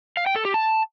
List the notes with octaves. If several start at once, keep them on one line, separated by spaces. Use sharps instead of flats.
F5
G5
A4
G4
A5